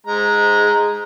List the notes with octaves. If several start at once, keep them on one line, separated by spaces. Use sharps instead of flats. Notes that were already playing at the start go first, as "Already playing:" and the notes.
G#3 A#5